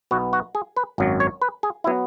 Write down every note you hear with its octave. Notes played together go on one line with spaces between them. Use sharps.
B1 B2 B3 F#4
F#4
G#4
B4
G#1 F#2 F#3
C#5
B4
G#4
F#3 B3 E4